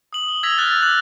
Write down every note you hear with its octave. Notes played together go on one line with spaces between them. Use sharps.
D#6 F#7
G7
E6 G#6 A#6 B6 F7
F6 F#6 A6
D6 E6 F#6 A6 F#7